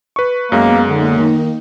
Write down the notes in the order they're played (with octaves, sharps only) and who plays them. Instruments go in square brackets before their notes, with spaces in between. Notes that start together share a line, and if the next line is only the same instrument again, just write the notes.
[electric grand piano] B4 C#6
[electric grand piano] F#2 G#3 [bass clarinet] A#3 [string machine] B3
[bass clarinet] D3 [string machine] A#3 D#4
[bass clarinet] D#3